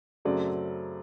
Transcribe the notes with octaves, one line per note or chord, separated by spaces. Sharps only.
F#2 C#3 F#3 A3 C4 D5